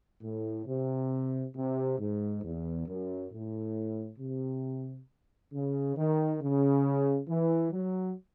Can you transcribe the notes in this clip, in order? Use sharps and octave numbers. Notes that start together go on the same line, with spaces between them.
A2
C3
C3
G#2
E2
F#2
A2
C3
C#3
D#3
C#3
E3
F#3